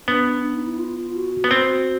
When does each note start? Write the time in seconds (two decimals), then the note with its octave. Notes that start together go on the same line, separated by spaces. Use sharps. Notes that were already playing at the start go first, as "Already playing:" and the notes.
0.07 B3 D4
0.43 D4
0.55 D#4
0.67 E4
0.79 F4
1.15 F#4
1.44 B3
1.51 C4 F#4